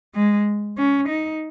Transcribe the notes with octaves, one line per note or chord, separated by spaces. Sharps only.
G#3
C#4
D#4